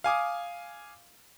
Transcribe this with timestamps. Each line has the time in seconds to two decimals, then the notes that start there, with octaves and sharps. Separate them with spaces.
0.04 F5 G#5 D6 D#6